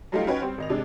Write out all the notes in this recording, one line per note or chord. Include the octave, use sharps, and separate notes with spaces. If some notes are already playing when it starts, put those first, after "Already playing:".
F#3 G3 A3 D#4 F4 G4
C#4 D#4 F#4 B4 C#5 G5
G3 C4 C5
G#1 D#5 F7
C3 G#3 D4